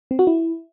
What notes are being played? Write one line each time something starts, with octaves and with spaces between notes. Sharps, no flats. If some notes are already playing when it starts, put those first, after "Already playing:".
C4
F#4
E4